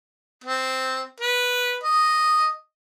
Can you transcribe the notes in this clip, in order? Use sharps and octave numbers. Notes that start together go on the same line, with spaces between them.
C4
B4
D#5